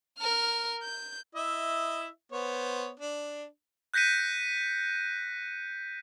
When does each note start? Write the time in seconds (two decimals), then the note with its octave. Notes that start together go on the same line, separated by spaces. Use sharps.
0.19 A#4 F6
0.83 G6
1.35 E4 D#5 E5
2.32 B3 C5 C#5
3.00 D4
3.94 F#6 G6 A#6 B6 C#7 D#7